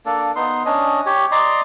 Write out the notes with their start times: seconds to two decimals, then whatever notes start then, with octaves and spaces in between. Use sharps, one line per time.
0.06 A#3 D4 A4
0.36 B3 D#4 C6
0.65 C#4 D4 D#5
1.06 G4 C#5
1.32 D5 D#5 A#5 C6